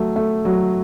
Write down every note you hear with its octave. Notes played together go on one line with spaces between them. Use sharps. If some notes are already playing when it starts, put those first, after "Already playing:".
Already playing: F#3 A3
A3
F#3